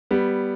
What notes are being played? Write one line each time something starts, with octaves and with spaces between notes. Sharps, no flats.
G3 B3